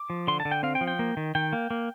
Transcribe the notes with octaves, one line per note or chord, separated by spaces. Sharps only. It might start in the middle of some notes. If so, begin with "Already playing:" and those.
Already playing: D6
F3
D3 C6
A5
D3
G5
C4 F5
G5
F3
G5
A#3
D#3
D#3 G5
A#3
A#3